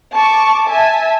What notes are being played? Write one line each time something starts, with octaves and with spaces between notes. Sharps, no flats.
A5 C#6 D6
E5 G#5 A5